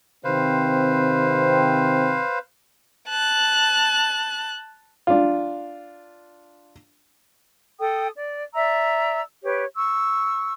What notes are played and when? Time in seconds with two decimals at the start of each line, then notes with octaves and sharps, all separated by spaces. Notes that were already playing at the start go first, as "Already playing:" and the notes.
0.24 C3 D#3 C4 B4 C5 F5
3.09 A5 F#6
5.07 D4 F4
7.79 A4 G5 D#6
8.15 D5
8.54 D5 E5 A#5 E6
9.43 G4 B4 C#5
9.76 C#6 E6